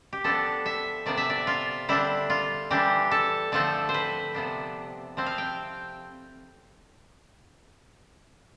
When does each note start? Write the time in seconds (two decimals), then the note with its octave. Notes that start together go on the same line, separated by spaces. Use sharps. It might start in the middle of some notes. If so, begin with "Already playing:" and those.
0.13 G4
0.24 F3 B3 D4 A4
0.66 E5
1.06 C3 F3 B3 D4 D5
1.17 E5
1.30 D5
1.47 F4
1.88 D3 G3 D4 E4
2.30 F4
2.70 E3 G3 D4 G4
3.11 A4
3.52 D3 F3 A3 C4 A4
3.89 C5
3.94 B4
4.35 C3 F3 B3 D4
5.17 F3 C4 E4
5.26 F5
5.38 G5